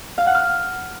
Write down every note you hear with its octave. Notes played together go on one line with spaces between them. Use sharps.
F5
F#5
F6